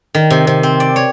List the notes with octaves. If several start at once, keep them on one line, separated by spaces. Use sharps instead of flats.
D#3
C3
C3
C4
D5
C#5